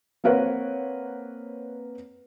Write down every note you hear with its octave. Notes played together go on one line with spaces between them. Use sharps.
A#3 C4 A#4 B4 C#5 F#5